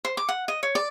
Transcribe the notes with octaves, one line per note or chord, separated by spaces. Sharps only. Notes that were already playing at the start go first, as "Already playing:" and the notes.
C5
D6
F#5
D#5
C#5
D5